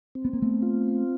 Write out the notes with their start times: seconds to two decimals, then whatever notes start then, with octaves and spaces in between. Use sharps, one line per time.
0.15 C4
0.25 B3
0.33 A#3
0.42 A3 B3
0.62 F4